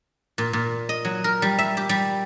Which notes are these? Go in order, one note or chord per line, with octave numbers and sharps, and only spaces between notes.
A#2
A#2
D#5
F#3
A#4
G3
E5
G4
G3